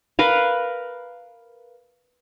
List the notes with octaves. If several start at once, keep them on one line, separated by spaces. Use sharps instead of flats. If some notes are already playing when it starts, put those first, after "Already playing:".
A#4 B4 F5